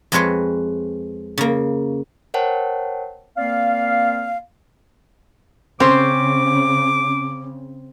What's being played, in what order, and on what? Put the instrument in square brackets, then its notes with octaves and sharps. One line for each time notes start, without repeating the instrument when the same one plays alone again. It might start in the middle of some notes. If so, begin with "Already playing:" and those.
[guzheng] F2 G#3 C4 B4 C#5 C6
C#3 A#3
[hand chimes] A#4 C5 C#5 F#5 G5 A5
[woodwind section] A#3 C4 D5 F5
[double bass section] C#3 [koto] C4 [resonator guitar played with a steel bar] C#4 C5 [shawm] D6